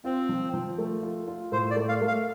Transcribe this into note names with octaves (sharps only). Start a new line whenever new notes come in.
C4 F4
F3
F3
A3
F4
F4
A2 C5
D5
A3
F5
A3
F5